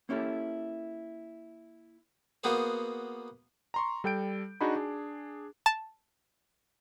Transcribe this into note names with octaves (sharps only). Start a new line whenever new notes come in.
A#3 C#4 E4 G4 A4
A#3 B3 F#4 G#4 C5
A#5 C6 C#6
G3 A4 G5 G6 D7
D4 D#4 F#4 G#4 B5
D4 G#4
A5